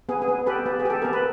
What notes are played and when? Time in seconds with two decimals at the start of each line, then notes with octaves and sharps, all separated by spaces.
0.09 B3 G#4
0.22 G#4
0.28 B3
0.46 G4 A4 B4
0.66 B3
0.80 G#4
0.85 G4 A4
1.02 B3 A#4
1.13 B4